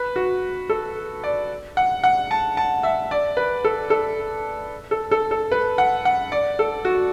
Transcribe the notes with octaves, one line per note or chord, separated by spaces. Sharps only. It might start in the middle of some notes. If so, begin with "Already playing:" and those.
Already playing: B4
F#4
A4
D5
F#5
F#5
A5
A5
E5
D5
B4
A4
A4
A4
A4
A4
B4
F#5
F#5
D5
A4
F#4